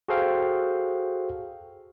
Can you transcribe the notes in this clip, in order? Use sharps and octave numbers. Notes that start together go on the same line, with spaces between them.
F#4 G#4 A4 C5 F5 G5